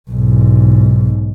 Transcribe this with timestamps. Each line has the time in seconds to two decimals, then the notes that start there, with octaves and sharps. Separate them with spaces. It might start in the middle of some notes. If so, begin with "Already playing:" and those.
0.11 B1 G#2